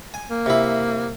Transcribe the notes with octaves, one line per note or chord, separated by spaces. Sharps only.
G#5
A#3
C3 E4